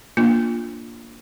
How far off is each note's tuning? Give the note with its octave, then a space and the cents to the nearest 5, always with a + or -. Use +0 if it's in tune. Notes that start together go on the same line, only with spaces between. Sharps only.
A#3 +0 D4 +0 F4 +0